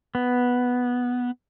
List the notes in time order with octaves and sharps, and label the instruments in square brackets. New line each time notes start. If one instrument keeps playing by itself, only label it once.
[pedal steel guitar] B3